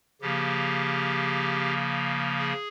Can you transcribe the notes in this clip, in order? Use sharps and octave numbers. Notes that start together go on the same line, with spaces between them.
C#3 F3 A#3 G4
G#4